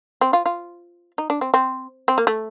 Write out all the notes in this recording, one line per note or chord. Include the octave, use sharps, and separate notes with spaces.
C4
F4
F4
D#4
D4
C4
C4
C4
A#3
A3